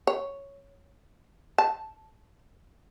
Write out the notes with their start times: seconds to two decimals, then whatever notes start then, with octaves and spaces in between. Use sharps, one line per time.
0.07 C#5
1.58 A5